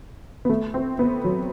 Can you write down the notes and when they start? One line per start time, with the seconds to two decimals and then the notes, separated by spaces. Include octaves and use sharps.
0.45 B3
0.50 A3
0.74 C4
0.99 B3
1.24 F#3